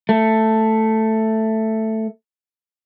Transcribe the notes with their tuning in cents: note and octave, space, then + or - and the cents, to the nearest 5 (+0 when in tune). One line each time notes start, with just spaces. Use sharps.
A3 +5